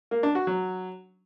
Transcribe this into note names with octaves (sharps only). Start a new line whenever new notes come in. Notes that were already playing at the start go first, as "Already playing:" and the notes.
A#3
D4
F#4
F#3